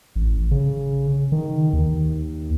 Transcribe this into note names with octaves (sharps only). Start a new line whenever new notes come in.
A1
C#3
D#3
D#2